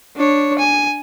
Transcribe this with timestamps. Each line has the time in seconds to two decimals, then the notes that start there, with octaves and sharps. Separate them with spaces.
0.16 D4 C#5
0.58 G#5